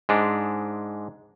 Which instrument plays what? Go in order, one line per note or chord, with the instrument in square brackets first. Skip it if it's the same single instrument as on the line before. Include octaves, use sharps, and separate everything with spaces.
[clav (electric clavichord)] G#2 G#3 D4